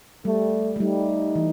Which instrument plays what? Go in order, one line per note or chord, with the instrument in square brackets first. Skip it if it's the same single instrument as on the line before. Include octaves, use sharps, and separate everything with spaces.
[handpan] G3 [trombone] A3
[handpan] A3
[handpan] G3 [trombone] D#4
[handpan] E3